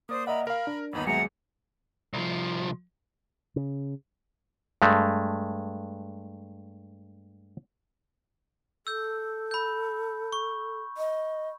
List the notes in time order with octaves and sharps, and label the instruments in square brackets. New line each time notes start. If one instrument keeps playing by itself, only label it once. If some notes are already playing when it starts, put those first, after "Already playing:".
[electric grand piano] A#3 D5 [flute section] C5 D#6
[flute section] A#4 B5 [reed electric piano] D#5 E5 F#5
[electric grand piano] A#4 [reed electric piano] F5 F6 [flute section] B5
[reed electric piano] D4
[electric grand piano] G1 D#2 B3 [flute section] D#4 B5
[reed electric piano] F#3 G#3 G#4 [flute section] E5 F#5 A#5 [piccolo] C#7
[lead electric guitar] C2 F3
[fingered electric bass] C#3
[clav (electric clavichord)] G2 G#3 A3
[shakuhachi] A4 [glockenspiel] E6 G6
[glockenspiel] B5 G6
C#6
[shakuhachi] D#5